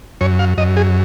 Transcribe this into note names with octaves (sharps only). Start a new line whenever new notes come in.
F#2 C#5
F5
F#2 D#5
G#4